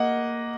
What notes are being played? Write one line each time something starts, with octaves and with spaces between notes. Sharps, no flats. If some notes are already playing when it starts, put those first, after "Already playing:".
Already playing: A#3 D#5 F#5